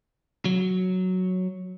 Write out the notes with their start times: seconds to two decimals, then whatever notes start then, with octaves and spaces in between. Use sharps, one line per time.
0.45 F#3